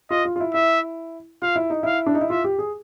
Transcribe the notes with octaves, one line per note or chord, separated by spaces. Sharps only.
F4 D#5
F4
F4
E4
E4 E5
F4 F5
E4
D#4
E4 F5
D4
D#4
E4
F4 E5
G4
G#4